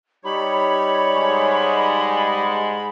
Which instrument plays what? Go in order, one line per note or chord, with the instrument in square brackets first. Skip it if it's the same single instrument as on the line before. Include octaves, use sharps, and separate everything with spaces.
[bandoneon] G3 D#4 G4 [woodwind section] C#5 [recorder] B5
[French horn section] G#2 G#3